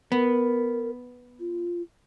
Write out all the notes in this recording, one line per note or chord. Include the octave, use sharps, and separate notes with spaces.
B3 A#4
F4